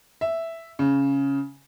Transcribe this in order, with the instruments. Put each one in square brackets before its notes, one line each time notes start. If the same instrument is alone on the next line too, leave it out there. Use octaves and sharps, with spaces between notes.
[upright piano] E5
C#3